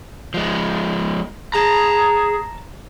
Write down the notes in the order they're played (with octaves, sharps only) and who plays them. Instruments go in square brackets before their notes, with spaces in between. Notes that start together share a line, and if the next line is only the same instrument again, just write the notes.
[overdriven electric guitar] F3 G#3
[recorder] G#4 [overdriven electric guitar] A5 A#5